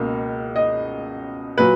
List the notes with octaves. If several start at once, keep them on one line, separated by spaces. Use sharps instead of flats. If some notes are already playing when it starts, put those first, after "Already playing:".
Already playing: C#2 B2 A#3
D#5
A#2 F#3 B4